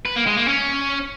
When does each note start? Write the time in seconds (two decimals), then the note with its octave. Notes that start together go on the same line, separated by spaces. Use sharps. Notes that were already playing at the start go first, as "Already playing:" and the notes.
0.05 B4
0.16 A#3
0.27 G#3
0.37 A#3
0.48 C#4